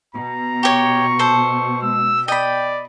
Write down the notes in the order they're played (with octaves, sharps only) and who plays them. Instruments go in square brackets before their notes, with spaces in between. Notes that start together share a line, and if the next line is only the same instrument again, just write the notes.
[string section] B2 [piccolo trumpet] A#5
[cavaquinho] G4 C#5 [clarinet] C#6
[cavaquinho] A4 C5
[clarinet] G#3 [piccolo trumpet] E6
[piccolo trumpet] D5 [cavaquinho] D#5 B5 [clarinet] G5